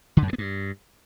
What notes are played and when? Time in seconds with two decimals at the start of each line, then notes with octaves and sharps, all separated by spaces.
0.17 D3
0.22 F#2
0.28 G2
0.33 B3
0.38 G2